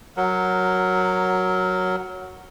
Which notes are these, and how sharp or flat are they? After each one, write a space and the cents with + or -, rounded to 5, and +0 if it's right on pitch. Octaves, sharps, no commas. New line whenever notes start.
F#3 +0 A#4 +0 F#5 +0